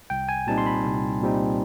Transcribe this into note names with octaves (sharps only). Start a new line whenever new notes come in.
C2 G5
G#5
A#2 G3 C4 D#4 A5
C6
B5
C2
A#2 G3 C4 D#4